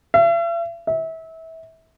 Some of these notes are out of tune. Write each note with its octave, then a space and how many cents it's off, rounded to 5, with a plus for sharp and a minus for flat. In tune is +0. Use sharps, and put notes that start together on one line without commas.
E5 +45
E5 -25